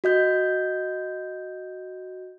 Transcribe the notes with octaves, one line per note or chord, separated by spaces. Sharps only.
F#4 D#5 G6